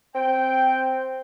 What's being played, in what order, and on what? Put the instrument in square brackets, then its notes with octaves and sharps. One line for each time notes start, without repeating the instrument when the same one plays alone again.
[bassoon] C4 [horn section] G5